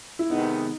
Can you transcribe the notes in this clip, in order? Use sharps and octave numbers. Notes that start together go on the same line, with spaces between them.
E4
C3 D#3 G#3 B3 D#4